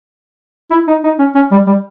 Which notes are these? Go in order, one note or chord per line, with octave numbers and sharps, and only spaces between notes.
E4
D#4
D#4
C#4
C#4
G3
G3